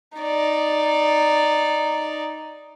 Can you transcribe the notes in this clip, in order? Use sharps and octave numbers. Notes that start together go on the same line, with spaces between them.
D#4 D5